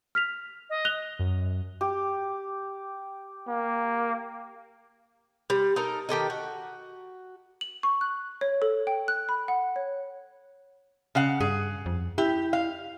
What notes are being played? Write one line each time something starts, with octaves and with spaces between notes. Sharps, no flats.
F6 B6 F7
D#5
F#6 F7 G7
F#2
G4
A#3
G3
D#4 A4 A#4
D#3 G4 A4 D#5
F#4
F#7
C#6
F#6
C#5
A4
G5
F#6
B5
F#5
C#5
C#3 F5 F#5
G2 G#4
F2
E4 G4
F5